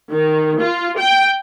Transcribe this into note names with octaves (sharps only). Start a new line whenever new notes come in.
D#3
F4
G5